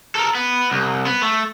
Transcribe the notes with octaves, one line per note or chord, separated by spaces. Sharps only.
A4 A#4
B3
C2
B3
A3